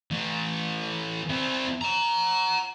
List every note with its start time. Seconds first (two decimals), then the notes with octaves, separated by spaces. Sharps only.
0.11 E3 A3
1.29 C4 E4
1.81 F#5 A#5